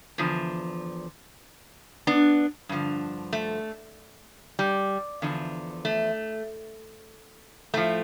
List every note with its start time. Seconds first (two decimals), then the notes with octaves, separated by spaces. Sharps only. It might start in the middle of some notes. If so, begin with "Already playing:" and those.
0.18 E2 D3 F3
2.07 B3 D4
2.69 G2 D3 F3
3.33 A3
4.59 G3
5.22 E2 D3 F3
5.85 A3
7.73 A2 F3 A3